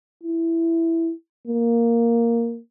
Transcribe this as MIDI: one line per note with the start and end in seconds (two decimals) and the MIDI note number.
0.24 1.12 64
1.47 2.59 58